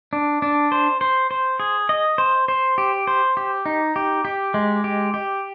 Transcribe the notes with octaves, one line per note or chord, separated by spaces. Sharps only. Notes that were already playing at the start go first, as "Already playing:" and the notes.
D4
D4
C5
C5
C5
G#4
D#5
C5
C5
G4
C5
G4
D#4
G4
G4
G#3
G4
G4